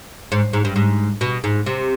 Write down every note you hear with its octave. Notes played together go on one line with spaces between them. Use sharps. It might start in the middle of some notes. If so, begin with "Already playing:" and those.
G#2
G#2
G2
G#2
B2
G#2
C3